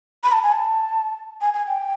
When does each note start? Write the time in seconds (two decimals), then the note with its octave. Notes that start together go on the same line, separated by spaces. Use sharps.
0.24 B5
0.32 A5
0.43 G#5
0.52 A5
1.41 G#5
1.54 G#5
1.67 G5